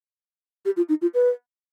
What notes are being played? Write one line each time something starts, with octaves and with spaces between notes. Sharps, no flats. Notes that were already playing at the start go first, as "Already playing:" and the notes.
G4
F4
D#4
F4
B4